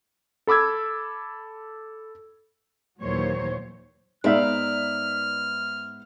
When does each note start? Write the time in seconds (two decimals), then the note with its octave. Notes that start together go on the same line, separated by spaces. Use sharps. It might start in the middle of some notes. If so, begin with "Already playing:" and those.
0.47 A4 B5 D6 E6 G#6
3.01 D#2 A#2 E3 F#3 C5 C#5
4.24 G#2 B3 D#4 D5 E5 F5 F6